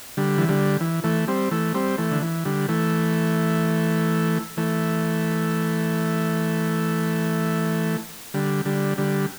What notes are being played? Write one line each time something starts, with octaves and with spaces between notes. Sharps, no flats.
D3 G3
E3
D3 G3
E3
E3 A3
G3 C4
E3 A3
G3 C4
E3 A3
D3
E3
D3 G3
E3 A3
E3 A3
D3 G3
D3 G3
D3 G3